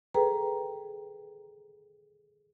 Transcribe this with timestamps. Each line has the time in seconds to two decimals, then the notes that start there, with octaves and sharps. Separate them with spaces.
0.14 G#4 A4 B4 G5 A#5